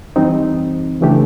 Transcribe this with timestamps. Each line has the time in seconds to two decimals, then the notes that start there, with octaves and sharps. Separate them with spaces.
0.16 E3 G3 C4 D#4
1.01 C#3 E3 A3 D4 G4